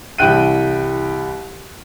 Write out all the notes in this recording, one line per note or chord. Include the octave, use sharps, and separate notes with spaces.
C2 E3 E5 G5 F#6 D#7